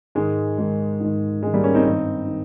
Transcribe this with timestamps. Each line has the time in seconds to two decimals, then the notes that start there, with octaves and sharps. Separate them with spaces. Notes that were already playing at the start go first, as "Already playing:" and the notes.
0.15 G#2 D#3 G#3
0.58 G#2 D#3
1.00 G#2 D#3
1.42 G#2 G#3
1.46 D#3
1.54 G3 A#3
1.64 A#3 C#4
1.74 C4 D#4
1.85 G2 D#3 C4 D#4
2.27 D#3